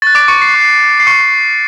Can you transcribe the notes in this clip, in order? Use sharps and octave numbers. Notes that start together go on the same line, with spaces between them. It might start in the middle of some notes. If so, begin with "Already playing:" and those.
C#6 F#6 A6
D6 D7
C#6 C#7
C7
C#6 F#6 C7
C7
C#6 D6 F6 C#7